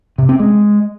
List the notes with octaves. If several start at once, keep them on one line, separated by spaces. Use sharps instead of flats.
C3
C4
G#3